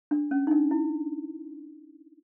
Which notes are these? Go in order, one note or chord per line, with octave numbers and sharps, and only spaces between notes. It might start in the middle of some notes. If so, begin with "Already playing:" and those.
D4
C#4
D#4
D4
E4